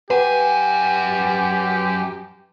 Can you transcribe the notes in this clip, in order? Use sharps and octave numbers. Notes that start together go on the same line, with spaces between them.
F#2 G4 B4 F#5 G#5